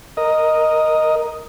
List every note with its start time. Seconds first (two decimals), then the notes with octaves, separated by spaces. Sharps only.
0.17 A#4 D#5